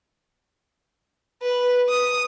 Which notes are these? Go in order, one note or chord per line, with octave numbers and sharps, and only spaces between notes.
B4
D#6